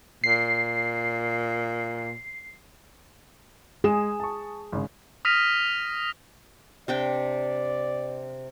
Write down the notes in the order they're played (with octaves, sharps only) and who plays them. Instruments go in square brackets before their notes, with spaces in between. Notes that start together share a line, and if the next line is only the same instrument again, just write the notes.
[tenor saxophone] A#2 [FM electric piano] C7
[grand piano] G#3 D#6 E7 [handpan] G#4
[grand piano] A5 C#6
G#1 C#3
[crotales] D#6 F6 A#6 B6 D#7 F7
[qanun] C3 D4 G5 [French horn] D5